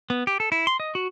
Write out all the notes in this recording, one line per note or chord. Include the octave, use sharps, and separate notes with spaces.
B3
G4
A4
E4
C6
D#5
F#4